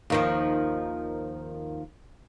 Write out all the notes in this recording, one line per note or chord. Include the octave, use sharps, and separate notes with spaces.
D#2 D#3 F3